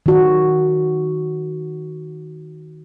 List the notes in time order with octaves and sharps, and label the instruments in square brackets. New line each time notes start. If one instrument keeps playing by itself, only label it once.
[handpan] D#3 F#4